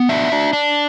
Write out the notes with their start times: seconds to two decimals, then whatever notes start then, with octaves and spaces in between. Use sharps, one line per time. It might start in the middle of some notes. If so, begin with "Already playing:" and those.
Already playing: B3
0.09 D4 E5
0.32 D4
0.53 D4